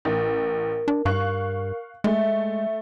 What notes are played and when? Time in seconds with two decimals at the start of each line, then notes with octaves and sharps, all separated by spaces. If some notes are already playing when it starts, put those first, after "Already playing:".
0.05 A1 A#4
0.88 D4
1.05 G2 F5 C#6 F#6
2.04 G#3 A3 E5